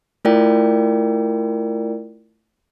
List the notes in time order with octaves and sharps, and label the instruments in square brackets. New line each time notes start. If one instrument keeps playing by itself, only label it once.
[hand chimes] A3 E4 F4 A#4 D5 G5